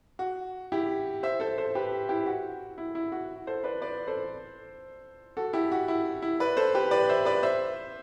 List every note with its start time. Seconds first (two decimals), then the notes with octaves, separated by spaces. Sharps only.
0.19 F#4
0.72 E4 G4
1.23 C5 E5
1.40 A4 C5
1.58 A4 C5
1.75 G4 B4
2.09 E4 G4
2.26 F#4
2.78 E4
2.95 E4
3.12 F#4
3.47 A4 C5
3.64 B4 D5
3.82 B4 D5
4.07 A4 C5
5.37 F#4 A4
5.53 E4 G4
5.72 F#4
5.88 E4
6.22 E4
6.40 B4 D5
6.57 A4 C5
6.74 G4 B4
6.91 B4 D5
7.09 C5 E5
7.25 B4 D5
7.43 C5 E5